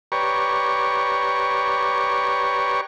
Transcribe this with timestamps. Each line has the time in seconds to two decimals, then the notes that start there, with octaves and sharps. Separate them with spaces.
0.12 G4 B4 C#5 D5 A#5 C#6